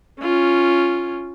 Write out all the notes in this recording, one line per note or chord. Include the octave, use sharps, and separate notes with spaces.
C#4 F4